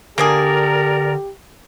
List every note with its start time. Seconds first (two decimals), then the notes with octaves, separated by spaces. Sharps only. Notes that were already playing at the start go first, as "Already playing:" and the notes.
0.18 D3 A#3 D4 G4 G#4 A#4 D5